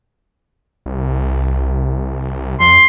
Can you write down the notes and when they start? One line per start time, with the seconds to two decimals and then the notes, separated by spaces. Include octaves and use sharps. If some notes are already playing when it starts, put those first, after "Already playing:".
0.86 C2
2.60 F2 C6